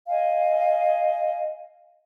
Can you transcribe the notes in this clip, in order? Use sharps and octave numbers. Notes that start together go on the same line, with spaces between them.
D#5 F5 G#5